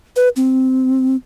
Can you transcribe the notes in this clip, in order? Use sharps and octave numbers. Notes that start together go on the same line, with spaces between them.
B4
C4